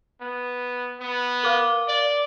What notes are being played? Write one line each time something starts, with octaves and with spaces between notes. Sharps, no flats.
B3
B3
A#4 F5 D6 G7
D5